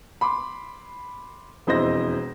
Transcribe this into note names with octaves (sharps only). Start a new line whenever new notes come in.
B5 C6 D6
E1 F2 E4 C5 D#5 A#6